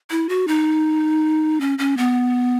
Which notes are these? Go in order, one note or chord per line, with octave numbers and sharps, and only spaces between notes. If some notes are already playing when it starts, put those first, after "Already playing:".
E4
F#4
D#4
C#4
C#4
B3